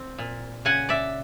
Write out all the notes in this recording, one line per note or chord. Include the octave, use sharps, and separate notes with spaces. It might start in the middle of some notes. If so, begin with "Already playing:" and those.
Already playing: C4
A#2
C#3 F#5 G#5
D5 E5